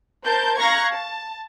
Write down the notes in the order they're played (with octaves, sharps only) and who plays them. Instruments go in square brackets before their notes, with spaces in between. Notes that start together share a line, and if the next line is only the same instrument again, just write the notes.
[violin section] A#4 C5 A5 G6
F5 A#5 C#6 F#6 G#6 A#6
A5